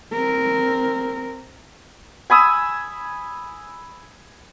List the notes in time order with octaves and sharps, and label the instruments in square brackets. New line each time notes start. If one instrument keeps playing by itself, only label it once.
[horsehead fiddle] C4 A#4
[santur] G#5 B5 D#6 E6